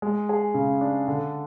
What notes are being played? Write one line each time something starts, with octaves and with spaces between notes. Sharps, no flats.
G#3
G#4
C#3
D4
D3